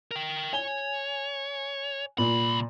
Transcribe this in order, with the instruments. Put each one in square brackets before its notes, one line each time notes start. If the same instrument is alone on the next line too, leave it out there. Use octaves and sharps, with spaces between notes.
[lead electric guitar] A#4 G5
[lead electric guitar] C#5 [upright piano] G#5 G7
[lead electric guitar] C2 B5 [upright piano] A#2